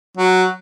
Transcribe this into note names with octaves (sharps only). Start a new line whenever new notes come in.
F#3